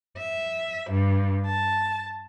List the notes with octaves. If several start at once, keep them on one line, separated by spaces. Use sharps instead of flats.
E5
G2
A5